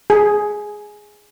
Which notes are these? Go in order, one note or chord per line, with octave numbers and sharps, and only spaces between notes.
G#4